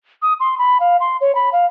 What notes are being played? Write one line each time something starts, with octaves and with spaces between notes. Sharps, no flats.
D#6
C6
B5
F5
C6
C#5
B5
F5